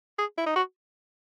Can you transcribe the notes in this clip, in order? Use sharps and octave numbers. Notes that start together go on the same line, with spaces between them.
G#4
E4
D#4
F#4